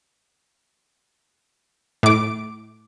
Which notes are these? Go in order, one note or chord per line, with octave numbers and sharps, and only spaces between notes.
A2 D6